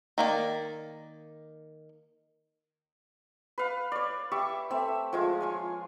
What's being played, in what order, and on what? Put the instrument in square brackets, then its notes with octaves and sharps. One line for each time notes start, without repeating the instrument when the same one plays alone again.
[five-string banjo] D#3 A#3 D5
[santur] B4 F5
C#5 D5
G4 E5 C#6 D6
A3 C4 E5
F3 G#3 F4
F4 C#5 G#5